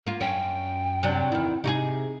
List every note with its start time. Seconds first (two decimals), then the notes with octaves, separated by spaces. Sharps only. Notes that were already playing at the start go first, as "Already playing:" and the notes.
0.07 A#3 F4
0.21 F#2 C#4 G5
1.03 C3 F#3 D4
1.32 E2 D#3 E4
1.64 C3 D#4 F#4 G#4